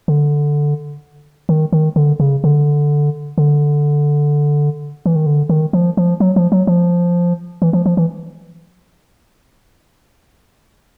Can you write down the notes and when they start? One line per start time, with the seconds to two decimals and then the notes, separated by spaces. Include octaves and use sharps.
0.08 D3
1.49 D#3
1.73 D#3
1.96 D3
2.20 C#3
2.44 D3
3.38 D3
5.06 E3
5.16 D#3
5.26 D3
5.49 D#3
5.73 F3
5.97 F3
6.20 F#3
6.36 F3
6.52 F#3
6.67 F3
7.62 E3
7.73 F3
7.86 F3
7.97 E3